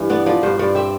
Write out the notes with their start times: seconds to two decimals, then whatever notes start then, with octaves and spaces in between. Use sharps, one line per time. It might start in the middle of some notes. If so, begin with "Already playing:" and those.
Already playing: G2 E3
0.10 B3 D5
0.26 F3 D5
0.43 G2 C5
0.59 G2 D5
0.75 C4 E5